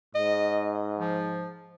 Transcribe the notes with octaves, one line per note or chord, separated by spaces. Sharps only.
G#2 D#5
F3